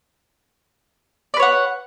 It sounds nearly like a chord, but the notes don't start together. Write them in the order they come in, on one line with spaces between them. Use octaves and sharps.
D5 B4 C#5 F#5